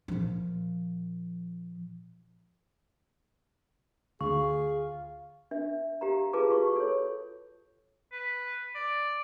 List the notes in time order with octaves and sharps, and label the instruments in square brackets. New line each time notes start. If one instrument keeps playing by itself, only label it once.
[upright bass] A#2 F3
[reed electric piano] D2 [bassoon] F4 [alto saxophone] G#4 [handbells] C#6
[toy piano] D4 E5
G4 F5 A#5
F4 G#4 B4 F5 A5 D6
F4 F#4 C#6
A4 C#5
[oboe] B4
D5